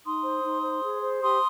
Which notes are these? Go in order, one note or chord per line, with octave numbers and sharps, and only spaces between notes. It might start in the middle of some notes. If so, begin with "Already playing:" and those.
D#4 C6 D#6
C5
D#4
C5
G#4
C5
G4 C6 D#6